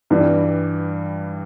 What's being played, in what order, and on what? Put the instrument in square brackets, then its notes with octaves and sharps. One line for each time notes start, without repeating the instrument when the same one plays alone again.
[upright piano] G2 E3 G3